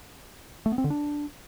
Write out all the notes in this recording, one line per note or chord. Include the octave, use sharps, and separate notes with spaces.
A3
B3
C4
D3
D4